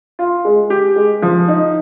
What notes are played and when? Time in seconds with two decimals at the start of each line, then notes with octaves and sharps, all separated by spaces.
0.19 F4
0.45 G#3
0.70 G4
0.96 G#3
1.22 F3
1.48 D#4